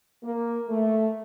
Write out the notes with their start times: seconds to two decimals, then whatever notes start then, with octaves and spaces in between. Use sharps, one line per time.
0.23 A#3
0.69 A3